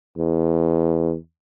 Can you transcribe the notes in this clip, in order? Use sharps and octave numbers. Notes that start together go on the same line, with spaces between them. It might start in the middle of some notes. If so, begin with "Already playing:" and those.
E2